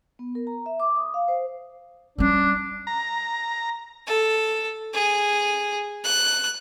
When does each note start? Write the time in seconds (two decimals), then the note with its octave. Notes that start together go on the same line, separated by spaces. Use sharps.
0.19 B3
0.35 A#4
0.47 A#5
0.66 E5
0.80 D6
0.96 D#6
1.14 F5
1.28 C5
2.18 G3 C#4 D4
2.87 A#5
4.07 A4
4.94 G#4
6.04 F#6